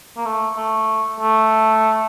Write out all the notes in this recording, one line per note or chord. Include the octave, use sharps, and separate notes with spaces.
A#3
A3
A3
A3